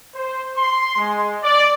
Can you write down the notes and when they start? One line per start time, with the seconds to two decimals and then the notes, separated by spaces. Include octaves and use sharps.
0.15 C5
0.57 C6
0.97 G#3
1.44 D5